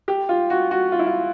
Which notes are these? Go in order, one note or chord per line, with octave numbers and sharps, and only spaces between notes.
G4
F4
F#4
F#4
F4
E4
F4